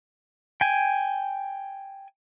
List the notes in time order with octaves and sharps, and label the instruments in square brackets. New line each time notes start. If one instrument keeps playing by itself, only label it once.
[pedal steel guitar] G5 G#5